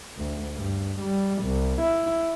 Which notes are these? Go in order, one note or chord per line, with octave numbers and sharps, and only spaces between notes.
D2
G2
G3
C2
E4